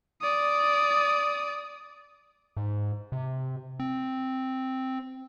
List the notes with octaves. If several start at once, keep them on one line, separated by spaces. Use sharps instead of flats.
D5 D#6
G#2
C3
C4